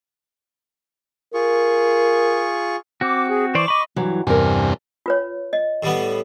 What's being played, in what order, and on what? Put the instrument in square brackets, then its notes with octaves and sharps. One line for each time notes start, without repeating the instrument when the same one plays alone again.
[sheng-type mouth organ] F4 G#4 C#6 [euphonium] A#4
[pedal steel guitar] C4 F#4 [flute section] D6
[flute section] G#4
[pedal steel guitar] E3 C5 D5 [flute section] C#6 D6
[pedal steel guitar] D#5 B5
[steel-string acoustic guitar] G2 E3 F#3
[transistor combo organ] E2 G2 C3 [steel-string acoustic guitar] A#4 G#5
[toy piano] F4 B4 C#5
D#5
[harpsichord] A2 G3 B3